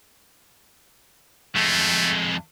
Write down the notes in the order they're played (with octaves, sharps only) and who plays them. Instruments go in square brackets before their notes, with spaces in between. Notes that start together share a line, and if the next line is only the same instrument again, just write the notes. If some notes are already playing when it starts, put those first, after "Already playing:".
[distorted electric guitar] F2 G#3 [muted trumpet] A3